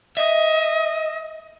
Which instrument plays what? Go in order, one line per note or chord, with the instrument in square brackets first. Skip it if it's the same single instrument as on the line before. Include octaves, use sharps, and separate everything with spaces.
[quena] D#5 [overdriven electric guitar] E5